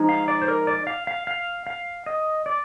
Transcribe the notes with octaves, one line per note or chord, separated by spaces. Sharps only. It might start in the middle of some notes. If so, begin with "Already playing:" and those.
Already playing: F3 G#3 D#4
F5
D5
C5
A#4
D5
F5
F5
F5
F5
D#5
D5